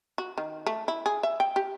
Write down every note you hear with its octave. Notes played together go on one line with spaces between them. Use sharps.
F#4
D#3
A3
E4
G#4
E5
G5
G4